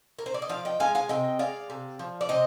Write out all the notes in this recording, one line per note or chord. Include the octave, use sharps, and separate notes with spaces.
A#4
C5
D5
D#5
F3 D5 F5
D#5 G5
G#3 F5 G#5
F5 G#5
C3 D#5 G5
G#3 D5 F5
C3
F3
D5
C3 C5 D#5